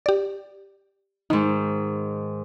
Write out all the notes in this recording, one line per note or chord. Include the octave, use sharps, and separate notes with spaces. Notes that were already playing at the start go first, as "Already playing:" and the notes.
G4 D5
G#2 D#3 D#4